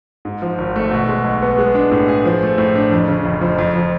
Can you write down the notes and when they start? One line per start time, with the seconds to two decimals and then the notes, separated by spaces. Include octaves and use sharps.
0.25 G#2
0.42 F3
0.58 G#1
0.76 A3
0.91 B2
1.09 G#3
1.25 B1
1.42 B3
1.58 G#3
1.75 D4
1.92 A2
2.08 G#4
2.25 F3
2.42 A3
2.58 A2
2.75 D4
2.92 F2
3.08 C#3
3.25 F1
3.41 F3
3.58 F2
3.75 F3